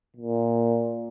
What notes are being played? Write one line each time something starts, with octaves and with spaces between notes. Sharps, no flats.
A#2